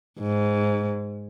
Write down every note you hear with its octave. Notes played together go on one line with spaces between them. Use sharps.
G#2